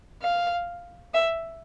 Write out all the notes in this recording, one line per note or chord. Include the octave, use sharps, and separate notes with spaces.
F5
E5